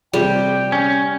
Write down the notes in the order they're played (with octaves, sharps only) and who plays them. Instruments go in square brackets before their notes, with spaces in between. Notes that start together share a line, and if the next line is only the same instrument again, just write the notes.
[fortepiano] C3 G4 [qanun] G3 [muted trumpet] G5
[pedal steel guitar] C#4